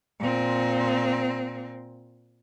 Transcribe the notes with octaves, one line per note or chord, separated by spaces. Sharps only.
A#2 C4